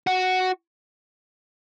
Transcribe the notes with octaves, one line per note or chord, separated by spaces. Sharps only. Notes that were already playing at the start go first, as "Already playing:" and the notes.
F#4